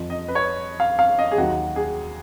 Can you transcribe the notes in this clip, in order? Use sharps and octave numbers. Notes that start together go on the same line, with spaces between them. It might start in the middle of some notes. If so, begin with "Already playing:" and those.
Already playing: F2 F3
D#5
B4
C#5
F5
F5
D#5
G#4
D#2 D#3 F#3 F#4
G#4